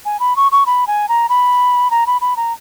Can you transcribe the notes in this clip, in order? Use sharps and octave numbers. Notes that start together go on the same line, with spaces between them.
G#5
B5
C#6
C#6
B5
G#5
A#5
B5
A#5
B5
B5
A#5